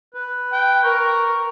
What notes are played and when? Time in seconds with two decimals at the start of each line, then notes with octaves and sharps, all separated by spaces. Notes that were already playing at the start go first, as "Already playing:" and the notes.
0.14 B4
0.53 G5
0.84 A#4 C#6